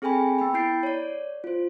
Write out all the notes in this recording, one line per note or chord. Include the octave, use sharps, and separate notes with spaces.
C4 G#4 A4 G5 G#5 B5
B3 G5 B5
E4 B5 G6 C7 D7
C#5 D5
F4 C5